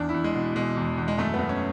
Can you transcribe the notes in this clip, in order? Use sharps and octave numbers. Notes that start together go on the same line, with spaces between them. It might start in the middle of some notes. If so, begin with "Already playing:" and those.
Already playing: E2 D4
E4
E2
G#3
B2
B2 G#3
E2
E2
G#3
F#2 A3
B3
F#2
C#4